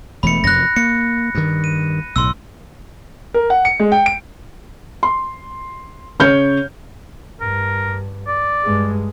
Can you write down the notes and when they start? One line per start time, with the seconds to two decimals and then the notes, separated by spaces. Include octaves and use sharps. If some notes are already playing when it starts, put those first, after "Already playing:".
0.23 E1 E3 A3 B5 C#7
0.44 F1 F#2 F#6 A#6
0.76 A#3 C#7
1.35 G2 D#3
1.64 D#7
2.16 B1 A2 C6 E6
3.34 A#4
3.50 F#5
3.65 C#7
3.80 G#3
3.92 G5
4.06 D7
5.03 C6
6.19 C#3 C#5 F6 G6
7.41 G2 A#4
8.27 D5
8.64 G2 G#3